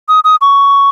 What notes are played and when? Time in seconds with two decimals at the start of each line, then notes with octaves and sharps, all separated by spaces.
0.09 D#6
0.24 D#6
0.41 C#6